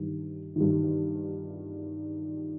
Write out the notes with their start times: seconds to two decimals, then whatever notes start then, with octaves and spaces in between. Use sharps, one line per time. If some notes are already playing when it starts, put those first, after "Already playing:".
Already playing: G2 D#3
0.56 G2 D#3